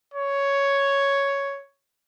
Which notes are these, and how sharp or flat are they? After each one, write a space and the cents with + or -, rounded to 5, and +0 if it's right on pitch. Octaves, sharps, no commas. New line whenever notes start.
C#5 +5